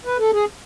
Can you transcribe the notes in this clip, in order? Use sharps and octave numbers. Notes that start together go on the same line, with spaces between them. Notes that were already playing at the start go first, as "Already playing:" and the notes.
B4
A4
G#4